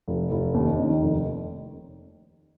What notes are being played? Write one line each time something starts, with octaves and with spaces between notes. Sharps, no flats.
F1
F1
D#2
D#3
F1